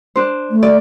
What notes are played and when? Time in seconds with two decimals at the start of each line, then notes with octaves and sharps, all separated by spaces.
0.16 D4 C5
0.50 A3
0.63 D5